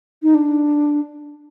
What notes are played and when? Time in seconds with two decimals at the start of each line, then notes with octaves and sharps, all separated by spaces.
0.23 D#4
0.34 D4